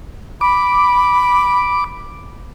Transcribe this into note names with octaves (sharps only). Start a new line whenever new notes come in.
B5 D6